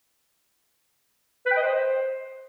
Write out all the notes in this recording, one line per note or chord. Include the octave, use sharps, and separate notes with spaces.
B4
G5
D#5
C5